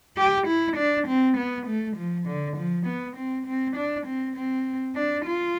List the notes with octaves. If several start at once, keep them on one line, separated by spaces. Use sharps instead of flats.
G4
E4
D4
C4
B3
A3
F3
D3
F3
B3
C4
C4
D4
C4
C4
D4
F4